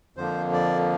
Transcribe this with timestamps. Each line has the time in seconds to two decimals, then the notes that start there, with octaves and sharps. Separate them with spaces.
0.16 F2 D3 F3 A#3 C5
0.53 D5